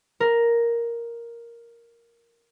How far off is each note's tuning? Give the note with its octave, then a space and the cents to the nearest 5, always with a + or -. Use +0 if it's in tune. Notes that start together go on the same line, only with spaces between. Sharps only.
A#4 +5